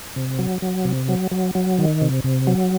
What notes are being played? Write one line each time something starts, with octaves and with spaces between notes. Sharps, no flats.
C3
F#3
F#3
C3
F#3
F#3
F#3
D#3
C3
C3
F#3